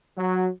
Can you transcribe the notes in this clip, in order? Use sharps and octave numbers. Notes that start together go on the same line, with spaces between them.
F#3